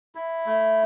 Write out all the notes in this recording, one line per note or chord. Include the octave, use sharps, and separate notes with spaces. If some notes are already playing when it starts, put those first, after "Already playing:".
E4
A3